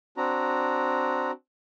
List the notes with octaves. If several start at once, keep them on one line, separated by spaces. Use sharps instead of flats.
C4 D4 F#4 A#5